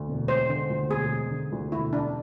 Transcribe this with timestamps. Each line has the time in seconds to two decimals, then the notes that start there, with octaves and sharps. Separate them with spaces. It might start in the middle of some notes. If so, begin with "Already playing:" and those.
Already playing: D2
0.08 E1
0.28 G#3 C5
0.49 D3
0.70 D2
0.90 E1 G#4
1.11 G#3
1.31 D3
1.52 D2
1.72 E1 E4
1.93 G#3 D4